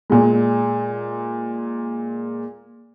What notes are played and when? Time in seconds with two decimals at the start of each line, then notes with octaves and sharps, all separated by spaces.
0.10 A#2 G#3